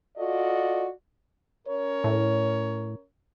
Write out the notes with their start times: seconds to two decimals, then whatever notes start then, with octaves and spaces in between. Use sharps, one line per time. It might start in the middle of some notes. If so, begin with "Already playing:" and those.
0.17 F4 F#4 A4 D5 D#5
1.67 C#4 A#4 C#5
2.04 A2